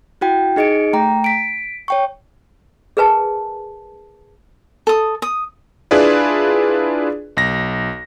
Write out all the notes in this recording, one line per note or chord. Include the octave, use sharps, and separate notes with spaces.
E4 F#4 G5
D#4 G#4 D#5 C#7 D7
A3 G5 A#5
B6 D7
C#5 G5 C#6
G#4 A#4 B4 G#5 A5
A4 D#6
D#6
D4 E4 F4 G#4 B4 D5
B1 A#6